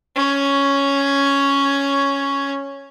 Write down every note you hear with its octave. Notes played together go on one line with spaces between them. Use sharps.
C#4 C#5